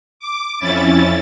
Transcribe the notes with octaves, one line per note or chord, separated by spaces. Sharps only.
D6
F2 C#4 E4 A6